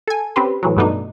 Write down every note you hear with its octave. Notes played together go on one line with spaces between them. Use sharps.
A4 G#5
C4 C#4 G4 B4 C5
A2 E3 F#3
G2 B2 A3 B3 D4 D#4